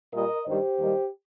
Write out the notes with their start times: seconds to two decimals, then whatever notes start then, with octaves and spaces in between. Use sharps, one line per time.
0.13 A#2 G3 A#4 D#5
0.46 G2 D#3 G3 G4 C5
0.80 D#2 D#3 G3